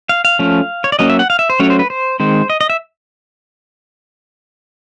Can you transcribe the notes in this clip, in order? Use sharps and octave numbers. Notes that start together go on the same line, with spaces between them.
F5
F5
F3 A3 C#4
C#5
D5
F#3 A#3 C#4 D#5
E5
F#5
F5
E5
C5
F#3 A3 C#4 C#5
C5
B4
C5
D#3 G#3 C4 C5
D#5
D#5
E5